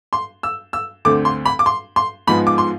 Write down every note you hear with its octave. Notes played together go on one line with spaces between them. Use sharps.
C6
E6
E6
D2 D3 A3 C4 D6
C6
B5
D6
C6
C6
G#2 F3 G#3 B3 B5
D6
C6